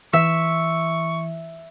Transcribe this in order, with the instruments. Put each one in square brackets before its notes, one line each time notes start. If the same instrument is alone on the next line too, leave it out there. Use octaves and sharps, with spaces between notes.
[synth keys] E3 [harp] E5 [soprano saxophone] C#6